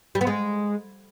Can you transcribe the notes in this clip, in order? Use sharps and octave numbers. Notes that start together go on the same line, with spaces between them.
G3
B3
G#3